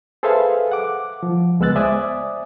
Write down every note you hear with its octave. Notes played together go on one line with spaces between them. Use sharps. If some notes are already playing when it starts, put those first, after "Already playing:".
G#4 A4 B4 C5 E5 F5
F#5 D6
F3
C#2 G#3 B3 E6 F#6 A6
C5 D5 E5 G#5 D6 D#6